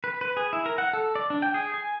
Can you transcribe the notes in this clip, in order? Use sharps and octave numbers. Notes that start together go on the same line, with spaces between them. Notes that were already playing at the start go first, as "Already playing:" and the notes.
B4
B4
G#4
E4
A#4
F#5
A4
D5
D4
G5
G#4
G#5